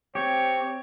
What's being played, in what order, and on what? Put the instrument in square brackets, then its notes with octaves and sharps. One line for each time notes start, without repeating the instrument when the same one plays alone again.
[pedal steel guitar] C4 G4 [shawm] C#5